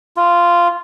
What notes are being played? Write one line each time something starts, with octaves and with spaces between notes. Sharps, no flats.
F4